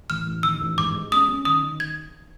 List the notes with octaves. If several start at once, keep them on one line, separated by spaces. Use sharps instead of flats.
A1 F6
A1
D#3 E6
A1
G#2 D6
G#3
C#4 D#6
C#4
D#3 D#6
D#3
G#6